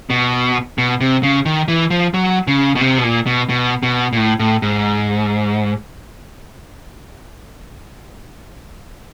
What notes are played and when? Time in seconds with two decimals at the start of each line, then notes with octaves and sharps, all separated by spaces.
0.10 B2
0.78 B2
1.01 C3
1.23 C#3
1.45 D#3
1.68 E3
1.90 F3
2.14 F#3
2.47 C#3
2.75 B2
2.81 C3
2.98 B2
3.03 A#2
3.26 B2
3.49 B2
3.83 B2
4.13 A#2
4.17 A2
4.40 A2
4.62 G#2